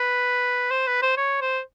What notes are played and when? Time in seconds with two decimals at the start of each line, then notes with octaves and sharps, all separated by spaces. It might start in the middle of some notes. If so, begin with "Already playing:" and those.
Already playing: B4
0.71 C5
0.87 B4
1.02 C5
1.18 C#5
1.41 C5